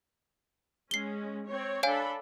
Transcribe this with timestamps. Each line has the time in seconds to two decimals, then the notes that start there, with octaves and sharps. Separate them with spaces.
0.91 G#3 C#4 C7 G7
1.47 C4 C#5
1.83 D4 A4 C#5 F5 G#5 B5